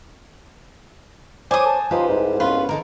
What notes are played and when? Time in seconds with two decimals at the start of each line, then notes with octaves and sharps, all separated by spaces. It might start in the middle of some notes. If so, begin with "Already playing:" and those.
1.51 C5 C#5 G#5 D6 D#6
1.66 A5
1.91 C#2 D#4 F4 G4 B4 C5
2.08 C2 G#2
2.40 B3 C#4 F4 B4 C6
2.69 D3 D#4 A4 A#4